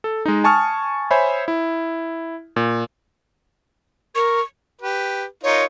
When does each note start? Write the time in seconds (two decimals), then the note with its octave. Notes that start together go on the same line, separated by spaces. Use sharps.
0.04 A4
0.26 G#3 D#4
0.44 G#5 A5 C#6 D#6 F6
1.11 C5 C#5 E5 G#5 B5
1.48 E4
2.56 A#2
4.15 A#4 C#6
4.82 G4 B4
5.43 D#4 F4 A#4 C#5